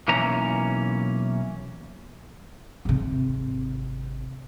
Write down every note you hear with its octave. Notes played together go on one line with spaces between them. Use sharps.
B1 E3 A#3 C#4 A#5
G#1 C3